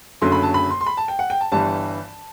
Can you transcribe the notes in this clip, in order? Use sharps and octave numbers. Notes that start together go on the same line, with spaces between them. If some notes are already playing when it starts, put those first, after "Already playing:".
F#1 F#2 D3 F#3 A3 C6
B5
A5
B5
C6
C6
B5
A5
G5
F#5
G5
A5
G1 G2 E3 G3 A5